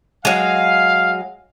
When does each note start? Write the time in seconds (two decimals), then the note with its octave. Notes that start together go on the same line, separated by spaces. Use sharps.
0.25 F#3 G#3 F5